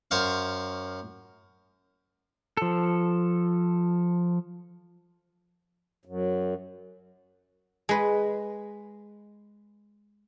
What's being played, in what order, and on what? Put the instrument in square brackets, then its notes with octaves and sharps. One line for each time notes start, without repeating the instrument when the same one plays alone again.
[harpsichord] F#2 C5 C#5 F5
[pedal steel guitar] F3 A4
[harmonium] F#2
[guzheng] G#3 B4